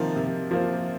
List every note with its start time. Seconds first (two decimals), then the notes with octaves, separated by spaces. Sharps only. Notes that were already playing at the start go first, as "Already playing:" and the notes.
Already playing: C3 D#3 F3 A#3 F4 C5
0.16 C3
0.51 F3 A#3 F4 C5